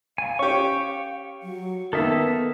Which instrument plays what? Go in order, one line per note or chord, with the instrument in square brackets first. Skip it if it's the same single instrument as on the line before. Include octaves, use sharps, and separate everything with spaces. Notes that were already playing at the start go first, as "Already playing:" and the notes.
[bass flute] F5 [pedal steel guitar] G#5
[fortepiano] C#4 G4 [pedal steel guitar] C#6
[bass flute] F#3
[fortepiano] D#3 A#3 [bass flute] B3 [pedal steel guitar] A4 E5